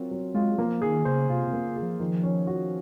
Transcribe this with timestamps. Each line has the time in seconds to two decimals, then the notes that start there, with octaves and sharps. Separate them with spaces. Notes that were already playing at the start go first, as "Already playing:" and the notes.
Already playing: F#3 C4 F4 A#4
0.11 F#3
0.34 G#3 F4
0.58 F3 A#3
0.82 D#3 G#4
1.05 C#3 C5
1.29 C3 F4
1.47 C3
1.53 A#3
1.64 C#3
1.76 G#4
1.82 F3
2.00 D#3 F3
2.24 C#4
2.47 F#4